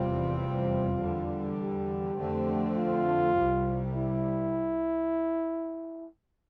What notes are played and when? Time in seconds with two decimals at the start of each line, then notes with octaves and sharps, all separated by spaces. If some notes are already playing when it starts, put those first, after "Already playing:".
Already playing: F1 E2 C3 G3 C4 F4
0.41 F4
0.99 E2 D3 G3
1.59 G4
2.17 F2 D3 A3 C4
2.76 F4
3.36 C2 C3 G3
3.94 E4